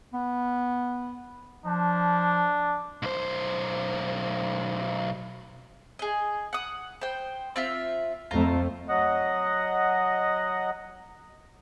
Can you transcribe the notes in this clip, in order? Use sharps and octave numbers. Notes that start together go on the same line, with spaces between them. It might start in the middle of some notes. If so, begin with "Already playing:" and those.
B3
F3 D4
B1 C5
G#4 D#5
F#5 D#6
C5 G5
C4 F4 E5
F2 A3 C4 F4 C5 A#5
F#3 D#5 F#5